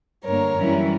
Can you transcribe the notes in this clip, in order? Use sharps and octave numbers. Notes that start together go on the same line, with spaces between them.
G2 D3 A#3 A#4 C#5
F#2 E3 G3 C#4 E4